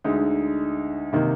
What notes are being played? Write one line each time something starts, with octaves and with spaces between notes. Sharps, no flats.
D2 D3 G#3 D#4
C3 D#3 A#3 D#4